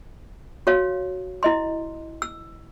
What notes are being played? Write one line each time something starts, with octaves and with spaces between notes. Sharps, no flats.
F#4 C#5 F5
E4 D#5 C6
E6